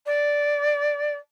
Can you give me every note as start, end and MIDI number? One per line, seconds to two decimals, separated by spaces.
0.06 1.15 74